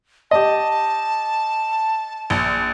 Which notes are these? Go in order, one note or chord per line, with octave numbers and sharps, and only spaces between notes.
G4 D#5 A5
A#1